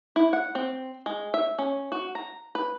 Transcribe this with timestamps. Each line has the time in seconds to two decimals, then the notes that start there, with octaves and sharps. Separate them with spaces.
0.16 E4
0.33 F#5
0.55 C4
1.06 G#3
1.34 E5
1.59 C#4
1.92 F#4
2.15 A#5
2.55 B4